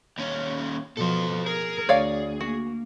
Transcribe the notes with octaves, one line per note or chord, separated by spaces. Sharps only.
D#2 C#4
B2 F3 A4 C5
G#4 A#4
D2 C#5 D5 F5
A#3 F#4